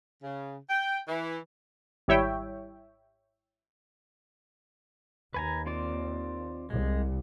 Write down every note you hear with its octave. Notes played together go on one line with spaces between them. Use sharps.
C#3
G5
E3
G#1 G3 E4 C#5 E5 G5
D#2 B4 G#5 A#5
C4 F4 D5
C2 G#3